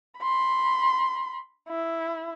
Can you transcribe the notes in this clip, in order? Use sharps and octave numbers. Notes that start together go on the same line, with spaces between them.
B5 C6
E4